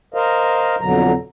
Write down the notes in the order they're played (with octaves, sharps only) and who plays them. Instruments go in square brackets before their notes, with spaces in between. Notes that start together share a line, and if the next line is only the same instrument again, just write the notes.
[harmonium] A#4 C5 D#5 F5
F2 B2 D3 F#3 A#5